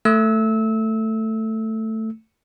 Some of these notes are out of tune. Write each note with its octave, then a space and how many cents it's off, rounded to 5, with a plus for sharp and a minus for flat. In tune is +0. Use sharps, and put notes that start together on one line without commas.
A3 +10 E6 -25